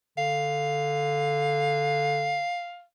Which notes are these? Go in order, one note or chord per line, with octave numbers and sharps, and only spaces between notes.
D3 F5